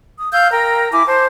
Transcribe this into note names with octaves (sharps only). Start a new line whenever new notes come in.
D#6
F5 E6 G6
A#4 G5 A#5
E4 G#5 D6
C5 A5